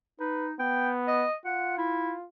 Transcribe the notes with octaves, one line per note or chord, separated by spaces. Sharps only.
D#4 B4
B3 G5
D#5
F4 F#5
E4